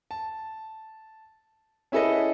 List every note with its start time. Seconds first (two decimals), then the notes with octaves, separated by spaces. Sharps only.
0.11 A5
1.92 C#4 E4 G#4 A4 B4 D#5